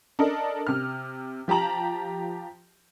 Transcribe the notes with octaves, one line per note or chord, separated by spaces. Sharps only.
D4 A4 A#4 D#5
C3 F6
F3 G4 A5 A#5 F#7